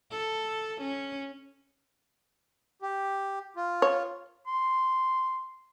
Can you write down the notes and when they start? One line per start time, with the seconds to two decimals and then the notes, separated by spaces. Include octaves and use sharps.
0.11 A4
0.81 C#4
2.82 G4
3.56 F4
3.82 C#5
4.47 C6